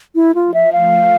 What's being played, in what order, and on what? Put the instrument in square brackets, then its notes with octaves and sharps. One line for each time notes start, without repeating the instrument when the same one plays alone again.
[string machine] A3 [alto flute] E4
[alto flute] F4
[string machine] F3
[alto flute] E5
[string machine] A3 [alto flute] F5